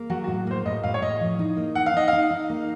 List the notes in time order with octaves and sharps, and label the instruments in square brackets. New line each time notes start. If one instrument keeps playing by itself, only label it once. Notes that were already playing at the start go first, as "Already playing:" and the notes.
Already playing: [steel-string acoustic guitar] A#3
[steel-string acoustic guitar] F#3 [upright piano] F#4
[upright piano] F#4
[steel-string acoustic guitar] A2
[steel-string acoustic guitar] A#3 [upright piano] C5
[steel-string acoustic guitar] A2 [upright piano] D#5
[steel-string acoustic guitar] A2 [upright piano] F5
[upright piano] C#5
[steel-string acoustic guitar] A2 [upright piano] D#5
[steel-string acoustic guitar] F3
D#4
A#3
[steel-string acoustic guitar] D#4 [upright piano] F#5
[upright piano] F5
[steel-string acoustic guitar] D#4 [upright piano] D#5
[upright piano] F5
[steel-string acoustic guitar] D#4
D#4
A#3